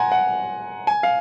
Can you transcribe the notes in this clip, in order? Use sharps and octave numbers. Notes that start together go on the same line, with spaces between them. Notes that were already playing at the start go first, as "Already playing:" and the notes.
Already playing: F#5 G#5 A#5 C6
F#5
G#5
F5